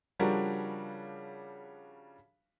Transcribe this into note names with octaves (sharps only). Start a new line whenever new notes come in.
C#3 F3 G3 D4 F#4 A#4